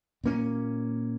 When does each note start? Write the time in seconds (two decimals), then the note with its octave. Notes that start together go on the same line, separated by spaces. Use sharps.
0.24 A#2 A#3 C#4